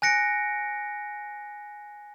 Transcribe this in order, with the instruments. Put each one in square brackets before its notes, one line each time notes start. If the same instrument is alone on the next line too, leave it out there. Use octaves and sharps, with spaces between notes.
[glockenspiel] G#5 F#6 A#6 C#7 D7